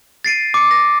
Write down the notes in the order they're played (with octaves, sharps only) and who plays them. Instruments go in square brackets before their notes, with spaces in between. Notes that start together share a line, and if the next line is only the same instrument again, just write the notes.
[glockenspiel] A6 C7 D7 D#7
D6 C#7
A#6